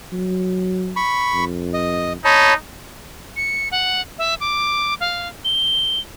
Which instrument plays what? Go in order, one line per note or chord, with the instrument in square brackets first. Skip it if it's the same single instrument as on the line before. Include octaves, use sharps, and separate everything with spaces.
[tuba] F#3
[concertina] B5 C#6
[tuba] F2
[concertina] D#5
[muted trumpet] D#4 [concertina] C#5 A5 B5
[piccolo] C#7
F#5
E5
D6
F5
G7